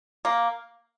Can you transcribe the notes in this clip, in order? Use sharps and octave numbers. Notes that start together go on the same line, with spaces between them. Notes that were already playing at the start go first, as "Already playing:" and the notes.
A#3